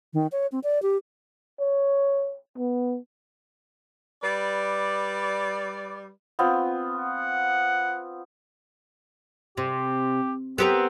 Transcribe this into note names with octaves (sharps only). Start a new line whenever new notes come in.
D#3
C#5
C4
D5
G4
C#5
B3
G3 B4 D5
B3 C4 F4
F#5
C3 G4
B3 C4 G4 A#4